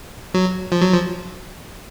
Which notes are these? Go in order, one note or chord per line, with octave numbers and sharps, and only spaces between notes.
F#3
F3
F#3
F3